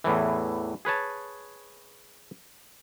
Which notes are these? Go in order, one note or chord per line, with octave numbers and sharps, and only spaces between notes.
E2 A2 E3
G#4 B4 C#5 A5